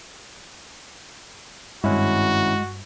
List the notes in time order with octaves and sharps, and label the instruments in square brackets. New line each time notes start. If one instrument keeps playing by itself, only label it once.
[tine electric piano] G#1 C#4 E4 [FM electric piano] G2 [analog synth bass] G#3 [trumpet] F#4